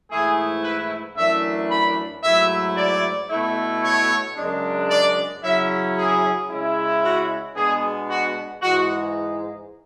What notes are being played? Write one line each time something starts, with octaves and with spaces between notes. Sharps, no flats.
G#2 E3 A3 E4 G#4
B4
F#2 E3 A3 D4 E5
B5
G#2 F#3 A3 E4 E5
D5
B2 A3 E4
C#5
F#2 C#3 G#3 D4
D5
C#3 F#3 C#4 E4 E5
G#4
C#3 G#3 C#4 E4
F#4
B2 G#3 B3 D4 G#4
F#4
G#2 E3 G#3 F#4